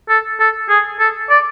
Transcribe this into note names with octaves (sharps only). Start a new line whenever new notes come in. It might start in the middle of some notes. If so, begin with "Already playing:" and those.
A4
A4
G#4
A4
D5